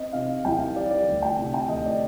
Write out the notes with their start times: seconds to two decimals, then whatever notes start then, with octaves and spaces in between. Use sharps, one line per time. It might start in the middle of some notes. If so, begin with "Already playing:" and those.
Already playing: C4 D#5
0.13 C3 F5
0.45 C2 G5
0.59 F5
0.76 G3 D5
0.91 D5
1.07 D2
1.22 G5
1.38 C3
1.54 G5
1.69 D2 D#5
1.86 D5